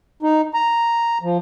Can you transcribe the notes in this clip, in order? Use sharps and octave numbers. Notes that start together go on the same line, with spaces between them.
D#4
A#5
F3